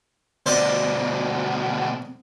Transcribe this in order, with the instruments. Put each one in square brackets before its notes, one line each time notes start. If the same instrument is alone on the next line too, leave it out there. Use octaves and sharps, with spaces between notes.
[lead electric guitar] D2 B2 [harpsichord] C5 D5 D#5